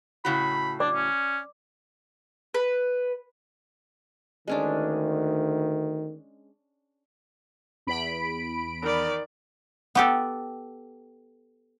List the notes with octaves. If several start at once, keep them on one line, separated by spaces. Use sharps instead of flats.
A2 C#3 F#4 B5
D4 D5 D6
C#4
B4
D2 D#3 G#3 C#4 D4
E2 B5 D7
D#3 D5
B3 G4 A4